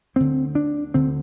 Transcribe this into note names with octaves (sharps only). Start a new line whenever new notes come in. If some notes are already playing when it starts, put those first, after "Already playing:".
D2 D3 C4
D4
D2 D3 C4